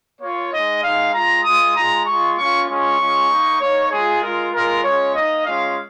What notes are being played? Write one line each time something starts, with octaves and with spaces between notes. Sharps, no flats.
A#3 F4 C#5
G#3 D#4 D#5
G#3 D#4 F5
G#3 F4 A#5
G#3 F4 D#6
G#3 F4 A#5
G#3 F4 C#6
A#3 C#4 F4 C#6
G#3 C#4 F4 C#6
G#3 C#4 F4
A#3 D#4
A#3 D#4 C#5
G#3 F4 G#4
G#3 F4 A#4
G#3 F4 A#4
G#3 C#4 F4 C#5
A#3 D#4 D#5
G#3 C#4 F4 F5